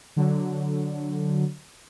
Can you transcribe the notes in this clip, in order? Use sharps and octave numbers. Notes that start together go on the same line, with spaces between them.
D3 F#3